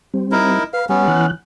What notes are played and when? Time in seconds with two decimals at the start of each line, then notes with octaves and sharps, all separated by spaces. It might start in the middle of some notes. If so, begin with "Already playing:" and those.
0.14 G3 C4
0.32 D#4 E4 A#4
0.73 B4 F5
0.89 G3 B3 C#4
1.08 E3 F#6